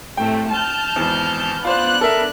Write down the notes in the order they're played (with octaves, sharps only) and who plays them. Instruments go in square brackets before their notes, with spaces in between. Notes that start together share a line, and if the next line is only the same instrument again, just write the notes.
[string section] A2 C3 A3 [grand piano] G5
[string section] A5 F6 G6
[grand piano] G#1 E2
[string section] B3 D4 F#6 [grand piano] F4 C5
[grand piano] A4 A#4 E5